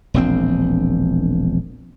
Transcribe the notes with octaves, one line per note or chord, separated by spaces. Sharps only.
E1 A#1 C4